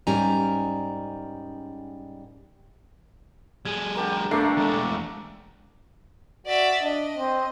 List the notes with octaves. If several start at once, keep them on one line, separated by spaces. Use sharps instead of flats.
G#2 G3 C#4 A#4 G#5 A#5
G3 G#4 G#6
D3 G4 A#4
G1 A3 A#3 D4 C7
E2 G#3
F#4 D5 E5
D4 D#5
C4